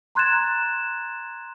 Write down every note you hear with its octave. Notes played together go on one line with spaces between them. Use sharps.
A#5 C6 F#6 G#6 A6 E7